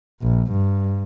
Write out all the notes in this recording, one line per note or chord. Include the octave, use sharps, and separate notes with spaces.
A#1
G2